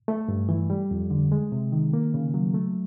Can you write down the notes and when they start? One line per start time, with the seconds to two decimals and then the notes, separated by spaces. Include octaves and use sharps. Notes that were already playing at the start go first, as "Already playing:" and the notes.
0.08 A3
0.28 G2
0.49 E3
0.70 G3
0.91 F2
1.10 D3
1.32 G#3
1.52 C3
1.72 D#3
1.93 A#3
2.14 C#3
2.34 F#3
2.54 A3